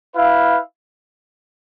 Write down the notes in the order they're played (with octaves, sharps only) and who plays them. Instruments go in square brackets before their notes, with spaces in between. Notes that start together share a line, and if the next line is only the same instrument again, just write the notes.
[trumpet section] E4 B4 F5